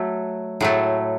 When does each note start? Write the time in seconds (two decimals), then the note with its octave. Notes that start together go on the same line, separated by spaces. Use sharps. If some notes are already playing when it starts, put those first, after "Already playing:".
Already playing: F#3 A3
0.61 A2 F#3 A3